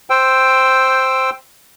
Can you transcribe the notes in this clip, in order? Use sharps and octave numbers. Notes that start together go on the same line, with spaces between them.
C5 G5 E6